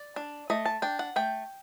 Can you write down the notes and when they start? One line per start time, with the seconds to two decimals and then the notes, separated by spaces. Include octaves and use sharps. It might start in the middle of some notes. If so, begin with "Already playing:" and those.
Already playing: D5
0.16 D4
0.50 A3 D#5
0.66 A5
0.82 D4 G5
0.99 F#5
1.16 A3 G5